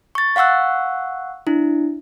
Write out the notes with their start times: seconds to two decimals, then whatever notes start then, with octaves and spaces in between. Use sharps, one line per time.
0.15 C#6 A6
0.36 F5 F#5 C#6 E6 F#6
1.47 D4 E4